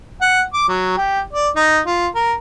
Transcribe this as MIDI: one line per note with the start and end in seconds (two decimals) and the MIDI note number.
0.21 0.42 78
0.53 0.64 86
0.68 0.92 54
0.97 1.20 67
1.33 1.48 74
1.56 1.80 63
1.86 2.07 65
2.15 2.33 70